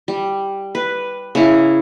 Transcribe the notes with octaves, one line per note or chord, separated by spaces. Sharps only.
G3
B4
C#3 E4